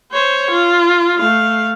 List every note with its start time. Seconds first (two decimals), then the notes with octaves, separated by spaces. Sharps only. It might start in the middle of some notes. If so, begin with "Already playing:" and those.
0.12 C5 C#5
0.51 F4
1.18 A3 F5